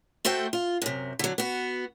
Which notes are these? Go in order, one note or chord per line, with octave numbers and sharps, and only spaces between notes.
A3 F#4 A4 C5 G5
F4
F#2 C3
D3 F#3
B3 F#4